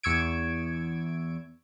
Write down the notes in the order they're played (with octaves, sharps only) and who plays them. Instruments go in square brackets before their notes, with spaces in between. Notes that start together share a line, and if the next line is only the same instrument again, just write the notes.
[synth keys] E2 C#6 E6 G#6 D7